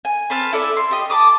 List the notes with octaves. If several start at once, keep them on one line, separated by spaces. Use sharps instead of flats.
G#5
C4 B4 A5 F6
E4 A4 D5 E5
C6
G4 D#5
A5 B5 D6 D#6